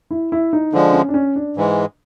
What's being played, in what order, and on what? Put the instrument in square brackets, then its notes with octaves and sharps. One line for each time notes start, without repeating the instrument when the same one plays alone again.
[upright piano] E4
E4
D#4
[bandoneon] D3 F3 G#3 [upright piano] D4
[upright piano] C#4
D4
C#4
D4
[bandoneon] G#2 E3 G#3